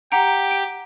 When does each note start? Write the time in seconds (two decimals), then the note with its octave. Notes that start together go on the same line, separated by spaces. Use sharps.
0.12 G4 F#5 A#5 D7
0.51 D7